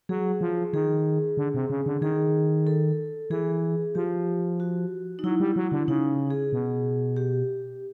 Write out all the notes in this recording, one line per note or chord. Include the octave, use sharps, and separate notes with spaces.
F#3 G#4
F3
D#3 G#4
D3
C3
C#3
D3
D#3 G#4
A4
E3 G#4
F3 G4
F#4
D#4
F#3 E4
G3
F#3
D3
C#3 D#4
G#4
B2
G4